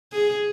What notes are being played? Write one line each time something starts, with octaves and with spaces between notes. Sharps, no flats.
G#4